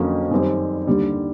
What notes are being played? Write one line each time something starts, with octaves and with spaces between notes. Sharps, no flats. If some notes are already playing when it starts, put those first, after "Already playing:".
Already playing: F2 D3 F#3 A#3 C#4
F#2 D#3 G3 C4
D#2 D3 G3